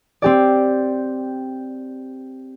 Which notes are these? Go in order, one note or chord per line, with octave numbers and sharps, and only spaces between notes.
C4 G4 D5